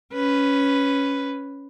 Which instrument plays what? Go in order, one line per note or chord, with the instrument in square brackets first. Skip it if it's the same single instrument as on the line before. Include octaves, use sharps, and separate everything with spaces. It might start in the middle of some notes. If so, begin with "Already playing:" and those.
[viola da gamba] C#4 B4